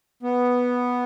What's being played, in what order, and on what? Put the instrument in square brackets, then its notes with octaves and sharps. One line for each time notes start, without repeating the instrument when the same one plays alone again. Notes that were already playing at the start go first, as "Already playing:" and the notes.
[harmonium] B3